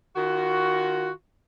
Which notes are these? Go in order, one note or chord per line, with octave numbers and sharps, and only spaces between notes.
D#3 F4 F#4